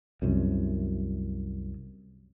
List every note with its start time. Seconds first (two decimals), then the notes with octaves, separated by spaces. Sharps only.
0.22 C2 F#2